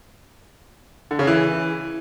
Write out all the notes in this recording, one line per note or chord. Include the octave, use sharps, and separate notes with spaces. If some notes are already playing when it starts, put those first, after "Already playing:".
D3
C#3
E3